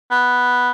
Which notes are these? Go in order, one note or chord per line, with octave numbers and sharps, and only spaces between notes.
B3